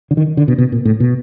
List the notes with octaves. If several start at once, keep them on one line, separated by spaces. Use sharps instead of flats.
D3
D#3
D3
B2
B2
A#2
A2
B2